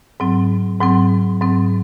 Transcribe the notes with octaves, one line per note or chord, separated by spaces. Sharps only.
G#2 F#3 C4
G#2 F#3 C4
G#2 F#3 C4